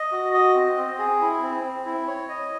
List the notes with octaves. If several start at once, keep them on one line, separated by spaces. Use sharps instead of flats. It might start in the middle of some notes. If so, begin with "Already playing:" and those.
Already playing: D#5
F#4
D#5
C4
C4
G#4
E4
C4
C4
E4
C#5
D#5